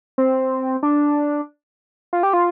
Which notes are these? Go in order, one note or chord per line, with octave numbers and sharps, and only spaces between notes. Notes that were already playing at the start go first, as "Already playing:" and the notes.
C4
D4
F4
G4
F4